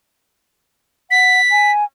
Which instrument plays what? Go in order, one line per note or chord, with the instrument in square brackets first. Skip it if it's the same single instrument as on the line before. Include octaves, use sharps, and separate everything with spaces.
[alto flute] F#5 [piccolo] B6
[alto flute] G#5